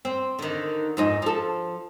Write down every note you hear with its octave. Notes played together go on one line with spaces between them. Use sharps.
C4
D3 D#3
F2 G#2 D#4
F3 A4